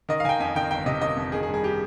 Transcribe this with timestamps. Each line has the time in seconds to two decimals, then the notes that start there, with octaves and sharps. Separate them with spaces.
0.09 D#3 D#5
0.20 F5
0.24 D#3 G#5
0.29 G5
0.40 F2 G#5
0.55 D#3 G5
0.71 G1 G5
0.86 C3 D#5
1.01 D#3 D#5
1.17 F2
1.32 D#3 G#4
1.43 G#4
1.48 G2
1.54 G#4
1.64 G4